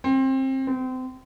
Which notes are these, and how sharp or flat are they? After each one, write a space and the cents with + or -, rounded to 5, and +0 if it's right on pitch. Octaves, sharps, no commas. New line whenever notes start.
C4 +25
C4 -30